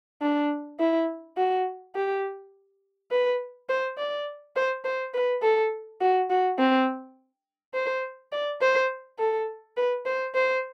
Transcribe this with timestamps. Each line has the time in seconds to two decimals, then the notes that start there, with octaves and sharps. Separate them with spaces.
0.22 D4
0.79 E4
1.37 F#4
1.95 G4
3.11 B4
3.69 C5
3.98 D5
4.56 C5
4.84 C5
5.14 B4
5.42 A4
6.01 F#4
6.30 F#4
6.58 C4
7.74 C5
8.32 D5
8.61 C5
9.19 A4
9.77 B4
10.05 C5
10.34 C5